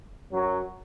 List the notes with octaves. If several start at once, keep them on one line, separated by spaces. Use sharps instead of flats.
F#2 F#3